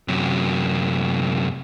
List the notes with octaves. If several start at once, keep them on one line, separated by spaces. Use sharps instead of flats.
F#2 C3